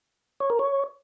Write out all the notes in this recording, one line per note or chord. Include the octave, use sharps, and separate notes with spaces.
C#5
A#4
C#5